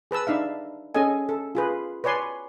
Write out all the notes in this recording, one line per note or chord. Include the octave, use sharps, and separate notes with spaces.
G#4 B4 A5 E6
D4 D#4 E5 F5
C#4 G#4 A4 D#5 G#5
A4
F4 G#4 B4
B4 C#5 D5 G#5 C6